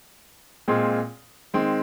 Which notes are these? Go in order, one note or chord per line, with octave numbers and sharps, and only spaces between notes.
A#2 G#3 C4 F4 G#4
D#3 G#3 C4